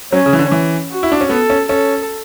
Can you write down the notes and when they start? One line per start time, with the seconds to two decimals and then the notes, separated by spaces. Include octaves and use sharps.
0.12 F#3 C#4
0.26 C#3
0.33 E3
0.39 D3
0.51 E3
0.91 F#4
1.03 E4
1.12 D4
1.21 C#4
1.30 B3 A4
1.50 C#4
1.69 C#4 A4